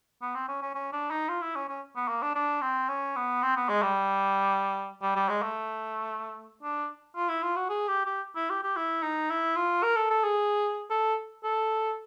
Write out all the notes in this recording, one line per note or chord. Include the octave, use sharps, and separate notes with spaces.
B3
C4
C#4
C#4
C#4
D4
D#4
F4
E4
C#4
C#4
B3
A#3
D4
D4
C4
C#4
B3
C4
B3
G#3
G3
G3
G3
G#3
A3
D4
F4
E4
F4
F#4
G#4
G4
G4
E4
G4
G4
E4
D#4
E4
F4
A#4
A4
A4
G#4
A4
A4